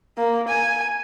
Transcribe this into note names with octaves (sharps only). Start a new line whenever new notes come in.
A#3
G#5